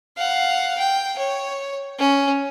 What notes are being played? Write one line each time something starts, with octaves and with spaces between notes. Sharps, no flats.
F5 F#5
G5
C#5
C#4